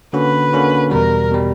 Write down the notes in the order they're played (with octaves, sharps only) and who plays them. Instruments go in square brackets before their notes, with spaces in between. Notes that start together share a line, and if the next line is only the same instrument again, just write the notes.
[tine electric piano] D3 A#3 C#4 F#4 [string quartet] B4
[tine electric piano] D3 A#3 C#4 F#4
[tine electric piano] E2 B2 G3 [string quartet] A#4
[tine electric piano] B2 G3